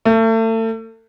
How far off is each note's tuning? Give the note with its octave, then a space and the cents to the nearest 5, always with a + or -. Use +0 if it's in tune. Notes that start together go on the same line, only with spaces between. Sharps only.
A3 +35